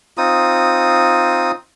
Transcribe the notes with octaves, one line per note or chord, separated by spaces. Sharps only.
C4 D#4 F4 D#6